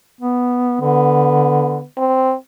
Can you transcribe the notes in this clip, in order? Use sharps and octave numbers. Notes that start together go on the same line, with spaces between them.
B3
D3 B3
C4